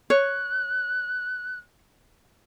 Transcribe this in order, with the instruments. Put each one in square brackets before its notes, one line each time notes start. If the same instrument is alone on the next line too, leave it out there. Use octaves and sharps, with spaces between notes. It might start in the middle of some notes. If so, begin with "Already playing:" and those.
[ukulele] C#5 [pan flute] F#6